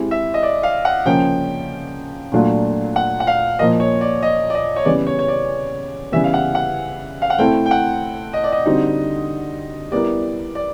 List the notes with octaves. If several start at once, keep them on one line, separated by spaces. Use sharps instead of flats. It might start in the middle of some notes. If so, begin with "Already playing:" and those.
Already playing: G#3 C4 E4 G4
E5
D#5
D5
F5
F#5
C#3 F3 A#3 C#4 G5
A#2 F#3 A3 D4 F4
F#5
F#5
F5
A#2 F3 A#3 D#5
C#5
D5
D#5
D5
D#5
C#5
C#3 E3 G3 B3 D5
C#5
C#5
D5
C#3 E3 G3 B3 E5
F5
F#5
F#5
F5
F#5
A3 C4 E4 A4 G5
G5
F#5
D#5
D5
D#5
D3 G3 C4 D#4 F#4
G3 B3 E4 G4 A#4 D5
D5